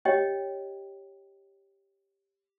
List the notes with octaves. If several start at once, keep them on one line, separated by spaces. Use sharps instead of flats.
G4 C#5 D#5 G5